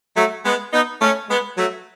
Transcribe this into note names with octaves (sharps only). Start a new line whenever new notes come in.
F#3 A3
G#3 B3
B3 D#4
A3 C#4
G#3 B3
F#3 A3